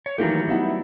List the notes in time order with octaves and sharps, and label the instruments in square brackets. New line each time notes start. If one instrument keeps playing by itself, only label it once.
[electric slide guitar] C#5
[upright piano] D#3 E3 A#3 [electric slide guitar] F#3 A3 G4
[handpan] E4
[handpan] G3 B3 E4 [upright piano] D#4 E5 F#5